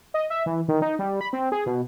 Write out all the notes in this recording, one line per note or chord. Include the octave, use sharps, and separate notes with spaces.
D#5
E5
E3
D#3
D#4
G3
B5
C4
G#4
B2